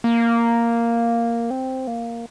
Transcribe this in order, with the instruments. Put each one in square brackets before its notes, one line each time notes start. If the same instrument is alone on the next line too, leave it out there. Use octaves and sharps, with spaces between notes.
[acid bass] A#3
C4
A#3